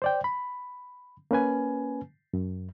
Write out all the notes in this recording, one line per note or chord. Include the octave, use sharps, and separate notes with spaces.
C5 D5 G5
B5
A#3 C#4 B4 G#5
F#2